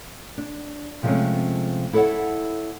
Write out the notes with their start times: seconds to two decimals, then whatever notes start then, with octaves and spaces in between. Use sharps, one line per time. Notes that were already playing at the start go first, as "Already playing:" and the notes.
0.38 D4
1.03 C3 F3 G#3 A3 C4 C#4
1.93 E4 A4 C#5 E5 F#5